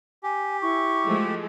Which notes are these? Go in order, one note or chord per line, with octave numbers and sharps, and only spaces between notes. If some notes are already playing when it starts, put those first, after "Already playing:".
G4 G#5
E4 C#6
F3 G#3 A3